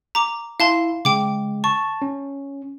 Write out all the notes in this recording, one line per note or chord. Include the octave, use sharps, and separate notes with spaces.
A#5 D6
E4 F5 A5 C6
C#3 G#3 G5 D6
A5 C#6
C#4